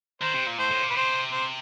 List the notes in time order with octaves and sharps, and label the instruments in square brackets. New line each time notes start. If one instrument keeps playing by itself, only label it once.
[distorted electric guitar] D#3 [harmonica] C5
[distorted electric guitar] C3
A#2
[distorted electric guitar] A2 [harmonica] C5
[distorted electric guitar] A2
A#2
[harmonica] B4
[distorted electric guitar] C3 [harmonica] C5
[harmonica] C5